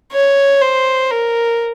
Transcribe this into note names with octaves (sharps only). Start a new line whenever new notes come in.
C#5
C5
A#4